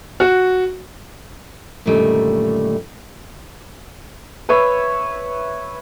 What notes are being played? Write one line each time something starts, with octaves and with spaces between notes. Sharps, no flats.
F#4
F#2 A#2 D3 D#3 G3 A3
B4 C#5 E5